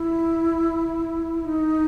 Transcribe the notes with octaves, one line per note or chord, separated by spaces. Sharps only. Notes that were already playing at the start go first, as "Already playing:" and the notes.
Already playing: E4
D#4